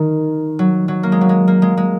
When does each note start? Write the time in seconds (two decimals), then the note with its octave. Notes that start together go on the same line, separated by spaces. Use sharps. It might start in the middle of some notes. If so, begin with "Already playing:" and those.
Already playing: D#3
0.59 F#3
0.88 F#3
1.03 A#3
1.12 G#3
1.21 F#3
1.29 G#3
1.48 A#3
1.62 G#3
1.77 G#3